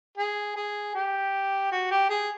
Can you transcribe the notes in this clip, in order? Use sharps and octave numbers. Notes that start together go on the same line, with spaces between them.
G#4
G#4
G4
F#4
G4
G#4